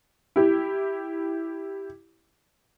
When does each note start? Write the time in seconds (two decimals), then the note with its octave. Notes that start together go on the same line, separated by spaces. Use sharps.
0.36 E4 G4